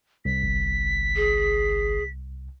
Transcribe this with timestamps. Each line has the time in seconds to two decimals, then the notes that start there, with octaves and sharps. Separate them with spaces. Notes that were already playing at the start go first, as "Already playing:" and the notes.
0.25 C2 B6
0.43 G1
1.16 G#4